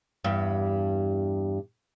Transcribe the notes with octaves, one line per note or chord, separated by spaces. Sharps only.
E2 G2